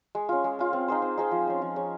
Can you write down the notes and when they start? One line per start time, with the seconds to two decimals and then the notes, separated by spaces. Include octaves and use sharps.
0.15 G#3
0.29 C#4 F4
0.44 G#3
0.59 C#4 F4
0.73 C4
0.88 D#4 G#4 C5
1.02 C4
1.18 D#4 G#4 C5
1.31 F3
1.47 G#3 C#4
1.62 F3
1.76 G#3 C#4